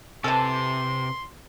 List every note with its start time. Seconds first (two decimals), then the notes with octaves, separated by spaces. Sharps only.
0.24 C3 E3 A4 C6